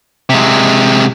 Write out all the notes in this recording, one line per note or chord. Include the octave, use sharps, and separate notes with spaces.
C3 G#3